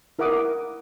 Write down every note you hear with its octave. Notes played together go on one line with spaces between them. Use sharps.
E4 A#4 E5 F#5 D6 D#6